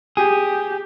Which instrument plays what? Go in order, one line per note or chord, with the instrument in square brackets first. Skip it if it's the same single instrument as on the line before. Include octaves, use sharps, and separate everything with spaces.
[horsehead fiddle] G4 [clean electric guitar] G#4